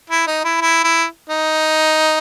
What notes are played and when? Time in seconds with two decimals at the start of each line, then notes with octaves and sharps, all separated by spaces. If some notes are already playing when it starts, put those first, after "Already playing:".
0.10 E4
0.27 D#4
0.44 E4
0.61 E4
0.84 E4
1.30 D#4